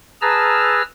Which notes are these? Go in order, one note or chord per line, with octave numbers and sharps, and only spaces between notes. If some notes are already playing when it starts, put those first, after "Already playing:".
G#4 B4 A5 A#5 E6 F6